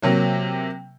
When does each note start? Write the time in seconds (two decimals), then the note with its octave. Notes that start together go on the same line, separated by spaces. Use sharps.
0.02 C3 F#3 A#3